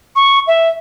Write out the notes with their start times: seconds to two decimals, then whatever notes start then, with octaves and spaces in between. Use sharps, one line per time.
0.16 C#6
0.47 E5